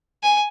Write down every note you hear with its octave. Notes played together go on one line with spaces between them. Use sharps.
G#5